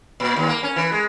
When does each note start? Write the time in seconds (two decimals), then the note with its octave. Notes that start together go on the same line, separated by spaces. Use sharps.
0.20 A#2
0.36 D#2
0.48 A#3
0.63 C#4
0.76 E3
0.92 G#3